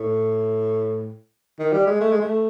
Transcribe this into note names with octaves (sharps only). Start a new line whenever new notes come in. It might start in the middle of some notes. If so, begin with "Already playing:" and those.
Already playing: A2
D#3
G3
G#3
A3
G#3
A3